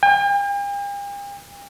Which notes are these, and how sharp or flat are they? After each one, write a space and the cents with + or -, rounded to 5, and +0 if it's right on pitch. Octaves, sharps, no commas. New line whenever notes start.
G5 +45